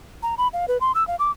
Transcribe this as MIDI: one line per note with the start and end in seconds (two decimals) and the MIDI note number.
0.23 0.35 82
0.38 0.48 83
0.53 0.66 77
0.68 0.78 71
0.81 0.92 84
0.95 1.06 88
1.07 1.16 77
1.19 1.31 86